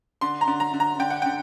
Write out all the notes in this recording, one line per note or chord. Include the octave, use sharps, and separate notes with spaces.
D3 C6
A#5
D3
A#5
D3
A#5
D3 G5
F#5
D3 G5